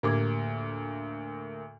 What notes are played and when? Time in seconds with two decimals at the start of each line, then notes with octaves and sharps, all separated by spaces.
0.03 D2 A2 A#3 D6 G#6